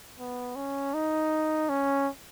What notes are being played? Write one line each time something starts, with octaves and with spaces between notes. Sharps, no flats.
B3
C#4
D#4
C#4